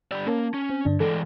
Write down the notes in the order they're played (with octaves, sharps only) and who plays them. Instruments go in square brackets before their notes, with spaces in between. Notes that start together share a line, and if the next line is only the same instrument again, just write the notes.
[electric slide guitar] D3 G4 D5 [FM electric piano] B5 E6
[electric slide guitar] A#3 [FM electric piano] C#4 A#4 A5
[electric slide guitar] C#4
[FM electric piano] C4
G2 D3 D4
[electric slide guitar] E3 G#3 D5 [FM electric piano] A4